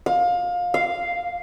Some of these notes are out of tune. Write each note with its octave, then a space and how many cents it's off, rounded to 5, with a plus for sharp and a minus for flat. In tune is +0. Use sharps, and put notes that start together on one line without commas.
F5 +25
F5 -5